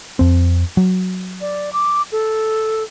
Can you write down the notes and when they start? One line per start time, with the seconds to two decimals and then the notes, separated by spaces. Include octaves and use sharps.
0.19 F2 C4
0.77 F#3
1.41 D5
1.73 D6
2.12 A4